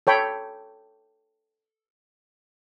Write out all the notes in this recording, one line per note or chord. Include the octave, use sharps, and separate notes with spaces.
A4 C#5 G5 B5